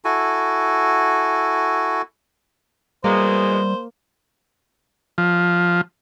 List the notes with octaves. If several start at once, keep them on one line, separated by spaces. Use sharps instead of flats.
E4 F#4 A4 G#5
B2 E3 G3 G#3 A#3 C5
F3